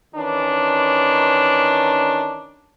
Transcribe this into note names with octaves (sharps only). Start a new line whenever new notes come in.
D#3 E3 C#4 D4